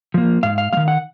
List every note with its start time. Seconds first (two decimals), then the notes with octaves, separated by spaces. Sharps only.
0.14 F3 A#3
0.43 G#2 F5
0.58 F5
0.73 G#3 F5
0.77 D#3
0.88 F#5